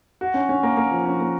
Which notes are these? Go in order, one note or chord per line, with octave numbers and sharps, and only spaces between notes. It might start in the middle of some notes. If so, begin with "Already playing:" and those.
F#4
C#4
C#4
A#3
A#3
F3
C#4
A#3